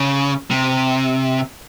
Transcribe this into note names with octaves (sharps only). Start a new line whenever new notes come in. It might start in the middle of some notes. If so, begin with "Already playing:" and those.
Already playing: C#3
C3